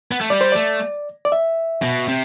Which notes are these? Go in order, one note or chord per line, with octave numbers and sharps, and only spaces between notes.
B3
A3
G3 D5
C5
A3 D5
D5
E5
B2
C3